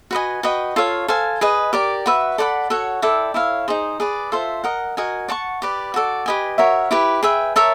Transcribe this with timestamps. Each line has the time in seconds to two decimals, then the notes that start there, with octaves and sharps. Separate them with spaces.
0.11 F#4 B4 D#5 G#5
0.43 F#4 B4 D#5 G5
0.76 F4 A4 C#5 F5
1.08 A4 C5 F5 G#5
1.41 G#4 B4 D#5
1.73 G4 A#4 D5
2.06 F#4 B4 E5
2.38 A4 D5 F#5 B5
2.70 F#4 A4 C#5 F#5
3.02 E4 A4 D5 G5
3.34 E4 A4 C#5 F5
3.68 D#4 G#4 C5
4.00 G#4 B4 D5
4.32 F4 A4 C5 E5
4.64 A#4 D#5 F#5
4.97 F#4 A#4 D#5 G#5
5.28 D5 F#5 A5 C#6
5.62 G4 B4 D5
5.94 F#4 A4 D5
6.26 G4 B4 D#5 G#5
6.58 F#4 A#4 C#5 E5
6.91 E4 G4 B4
7.23 G#4 B4 E5 G5
7.56 A#4 C#5 E5 A5